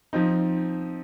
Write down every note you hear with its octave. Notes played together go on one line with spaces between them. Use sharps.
F3 C4 D#4